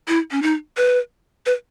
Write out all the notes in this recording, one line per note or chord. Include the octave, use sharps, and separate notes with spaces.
E4
C#4
D#4
B4
B4